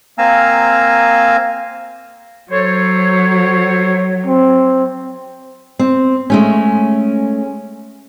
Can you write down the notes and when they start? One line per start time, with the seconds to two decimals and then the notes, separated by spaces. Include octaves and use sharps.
0.18 A#3 C4 F5 G#5 A#5 E6
2.51 F#3 A4 C5 C#5
4.27 C4
5.79 C4
6.30 G#3 A3 C#4